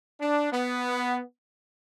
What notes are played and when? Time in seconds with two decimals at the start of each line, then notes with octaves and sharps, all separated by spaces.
0.21 D4
0.53 B3